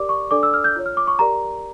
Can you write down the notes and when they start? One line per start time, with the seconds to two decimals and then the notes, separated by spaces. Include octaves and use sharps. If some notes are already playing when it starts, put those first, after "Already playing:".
Already playing: G4 A#4 D5 D6
0.09 C#6
0.31 D4 A4 D5 D6
0.43 E6
0.54 F6
0.64 G6
0.76 F4 C#5
0.86 F6
0.97 D6
1.07 C#6
1.19 G4 A#4 D5 A#5